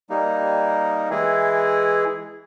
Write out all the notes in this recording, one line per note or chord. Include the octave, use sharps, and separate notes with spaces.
G3 A#3 D#4
E3 G#3 E4 G#4